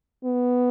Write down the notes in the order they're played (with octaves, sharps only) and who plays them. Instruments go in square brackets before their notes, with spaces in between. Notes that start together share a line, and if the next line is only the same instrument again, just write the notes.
[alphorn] B3